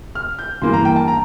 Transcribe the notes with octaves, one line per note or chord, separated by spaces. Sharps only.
F6
G6
G2 E3 A#3 C6
A#5
G5
A5
A#5